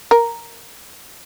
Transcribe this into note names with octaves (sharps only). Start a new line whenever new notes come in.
A#4